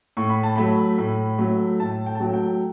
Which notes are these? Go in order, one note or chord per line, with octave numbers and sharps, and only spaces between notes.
A2 C#6
B5
A5
F#3 A3 B5
A2
F#3 A3
A2 A5
G5
A5
F#3 A3 G5
G5